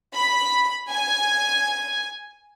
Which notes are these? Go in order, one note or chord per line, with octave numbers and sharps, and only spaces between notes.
B5
G#5